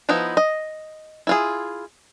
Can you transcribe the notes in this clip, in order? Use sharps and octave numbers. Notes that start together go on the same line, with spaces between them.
F3 B3 D#4 E4
D#5
E4 F4 G#4